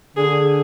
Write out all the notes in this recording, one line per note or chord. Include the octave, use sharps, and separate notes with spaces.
D3 G#4